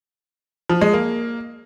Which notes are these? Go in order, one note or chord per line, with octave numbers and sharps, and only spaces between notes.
F3
G#3
A#3